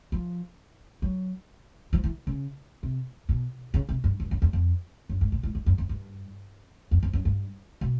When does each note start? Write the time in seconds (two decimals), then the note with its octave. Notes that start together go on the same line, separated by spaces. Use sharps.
0.12 F3
1.02 F#3
1.93 F3
2.04 E3
2.27 C#3
2.83 C3
3.29 B2
3.74 C#3
3.89 C3
4.04 G2
4.20 G2
4.31 F#2
4.42 E2
4.53 F2
5.09 F#2
5.21 G#2
5.32 A#2
5.43 A2
5.55 G2
5.66 F#2
5.78 F2
5.89 G2
6.91 F2
7.03 F2
7.13 F#2
7.25 G2
7.81 B2